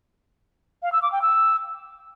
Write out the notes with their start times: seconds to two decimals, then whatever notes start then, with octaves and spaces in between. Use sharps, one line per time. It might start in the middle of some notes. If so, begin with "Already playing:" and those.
0.83 F5
0.92 E6
1.02 D6
1.12 G5
1.22 E6